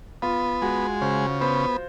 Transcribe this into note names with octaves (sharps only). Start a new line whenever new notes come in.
B3 F4
G#3 F#4
C#3 C5
B3 C5